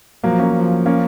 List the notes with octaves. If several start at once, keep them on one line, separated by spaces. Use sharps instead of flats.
F3 F#3 A#3
A#3 C#4
F3
A#3 C#4